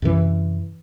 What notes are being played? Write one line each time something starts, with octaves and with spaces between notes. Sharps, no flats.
F#2 C3 E3